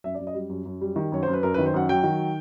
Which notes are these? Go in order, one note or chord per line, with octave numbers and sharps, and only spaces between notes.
F#2 E5
D5
F#2
D#5
G3
F#2
F#2
G3
D#3
F#2 C#5
C5
F#2
B4
F#2 A#4
B4
D#3
C5
F#2 F#5
F#3 G5
D#3